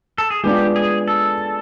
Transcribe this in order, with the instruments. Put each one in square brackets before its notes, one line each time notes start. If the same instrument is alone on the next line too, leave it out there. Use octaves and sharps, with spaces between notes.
[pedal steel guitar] A4
G#4
[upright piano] G#3 B3 D4 F4 [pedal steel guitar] G4
[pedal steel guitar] G#4
A4